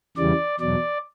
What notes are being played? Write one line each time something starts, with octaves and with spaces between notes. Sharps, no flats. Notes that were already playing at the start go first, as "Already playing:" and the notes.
E2 C#3 E3 G3 D5
E2 B2 F#3 D5